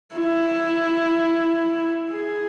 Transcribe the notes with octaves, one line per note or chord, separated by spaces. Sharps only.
E4
G#4